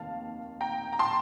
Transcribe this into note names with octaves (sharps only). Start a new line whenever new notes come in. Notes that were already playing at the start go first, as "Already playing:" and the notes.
Already playing: F1 D#2 D#3 F5 A5
G5 A#5
A#5
A5 C6